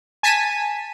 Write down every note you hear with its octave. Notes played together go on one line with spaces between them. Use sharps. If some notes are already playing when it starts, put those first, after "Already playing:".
G#5 A5 B6 D#7